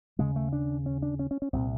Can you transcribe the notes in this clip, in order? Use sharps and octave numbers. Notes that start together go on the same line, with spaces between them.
D#2 C#3 G#3
A3
D4
C#4
D4
C#4
C#4
C#4
C2 A#2 C4